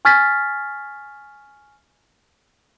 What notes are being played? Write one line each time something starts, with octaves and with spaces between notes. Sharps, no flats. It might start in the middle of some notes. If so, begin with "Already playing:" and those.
G#5 C#6 F6 G#6 A6 B6